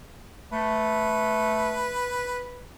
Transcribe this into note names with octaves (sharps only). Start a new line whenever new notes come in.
A3 B4